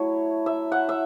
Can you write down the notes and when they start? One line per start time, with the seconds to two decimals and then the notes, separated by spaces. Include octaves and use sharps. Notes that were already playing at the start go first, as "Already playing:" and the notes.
Already playing: F#3 A3 E4 C#5
0.46 E5
0.72 F#5
0.89 E5